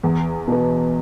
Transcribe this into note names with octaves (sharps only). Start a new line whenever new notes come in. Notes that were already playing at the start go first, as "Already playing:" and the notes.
E2
B2 B3